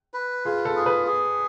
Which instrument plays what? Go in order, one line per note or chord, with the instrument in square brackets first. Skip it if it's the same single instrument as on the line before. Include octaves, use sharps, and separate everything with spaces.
[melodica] B4
[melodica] F4 [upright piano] G#4
[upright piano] A4
[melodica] G#4
[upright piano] B4
[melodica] G#4